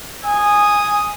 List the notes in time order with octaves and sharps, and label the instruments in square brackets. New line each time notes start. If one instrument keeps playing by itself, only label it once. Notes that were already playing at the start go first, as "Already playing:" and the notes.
[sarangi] G#5 [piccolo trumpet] D#6